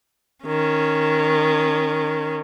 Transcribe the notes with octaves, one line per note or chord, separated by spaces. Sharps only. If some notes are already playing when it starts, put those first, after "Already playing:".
D#3 C#4